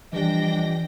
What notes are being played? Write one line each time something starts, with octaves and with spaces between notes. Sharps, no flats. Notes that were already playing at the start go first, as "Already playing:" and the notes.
E3 F3 G3 D4 D#5 G5 A#6